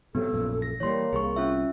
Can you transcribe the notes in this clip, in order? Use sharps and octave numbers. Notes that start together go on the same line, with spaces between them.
G#2 C3 F#3 B3 A4
A#1 F#2 A#2
A#6
E3 G3 A#3 C#5 C6
C2 G#4 C#6
C#4 F4 E5